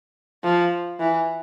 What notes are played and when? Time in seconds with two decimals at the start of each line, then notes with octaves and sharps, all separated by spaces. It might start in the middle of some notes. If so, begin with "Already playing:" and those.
0.44 F3
1.00 E3